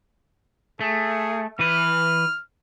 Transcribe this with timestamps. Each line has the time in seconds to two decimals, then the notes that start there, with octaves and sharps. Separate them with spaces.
0.81 A3 G#4
1.59 E3 B4 F6